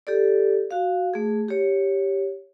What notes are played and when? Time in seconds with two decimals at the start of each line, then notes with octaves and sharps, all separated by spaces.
0.07 G4 A4 D5
0.71 F#4 F5
1.14 A3 G#4
1.48 G4 C#5